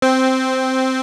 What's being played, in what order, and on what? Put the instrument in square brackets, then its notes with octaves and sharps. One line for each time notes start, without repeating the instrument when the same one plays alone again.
[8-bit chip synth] C4